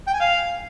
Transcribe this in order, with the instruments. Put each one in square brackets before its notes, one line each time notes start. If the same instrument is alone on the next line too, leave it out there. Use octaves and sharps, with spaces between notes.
[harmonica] G5
G#5
F5